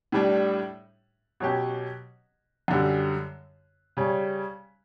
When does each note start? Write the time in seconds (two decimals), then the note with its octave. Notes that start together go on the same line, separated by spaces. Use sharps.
0.12 A2 G3 D4
1.40 B2 F#3 C#4 G4
2.68 F#2 D3 G3
3.97 C#3 G3 C#4